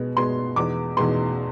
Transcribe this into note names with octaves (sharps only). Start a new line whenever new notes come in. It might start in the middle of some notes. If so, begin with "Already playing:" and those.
Already playing: B2 G#3 B3
B2 G#3 B3 C6
E2 B2 G#3 B3 D6
E2 B2 G#3 B3 C6